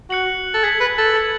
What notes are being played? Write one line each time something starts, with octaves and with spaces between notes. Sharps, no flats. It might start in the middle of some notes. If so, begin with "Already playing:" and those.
F#4 F#6 C#7 F#7
A4
G#4 G#6 B6 F#7
B4
A4
G#6 B6 F#7